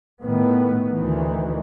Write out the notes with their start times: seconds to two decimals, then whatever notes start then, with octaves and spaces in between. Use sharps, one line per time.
0.23 A2 D#3 B3
0.93 D2 D#3 E3